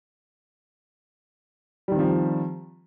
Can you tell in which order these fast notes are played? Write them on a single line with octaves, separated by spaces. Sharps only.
G3 D#3 C4 F3